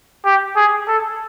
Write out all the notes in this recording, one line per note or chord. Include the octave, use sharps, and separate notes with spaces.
G4
G#4
A4